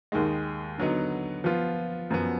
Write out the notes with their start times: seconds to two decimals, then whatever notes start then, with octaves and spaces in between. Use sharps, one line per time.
0.12 D#2 D#3 G#3
0.78 D3 F#3 B3 D#4
1.44 F3 B3 F4
2.10 F#2 F3 B3